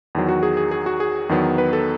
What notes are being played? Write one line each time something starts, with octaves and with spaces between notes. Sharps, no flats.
E2 D#3 F#3
F#4
G#4
G#4
G#4
F#4
G#4
E2 D#3 F#3 B3
B4
A4